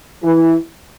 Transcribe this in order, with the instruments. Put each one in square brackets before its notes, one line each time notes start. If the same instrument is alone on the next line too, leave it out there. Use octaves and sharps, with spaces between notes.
[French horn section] E3